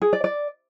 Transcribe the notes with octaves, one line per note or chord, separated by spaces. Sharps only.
G#4
D5
D5